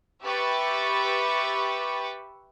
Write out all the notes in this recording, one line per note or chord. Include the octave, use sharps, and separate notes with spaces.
G4 B4 E5 C#6 D6 A6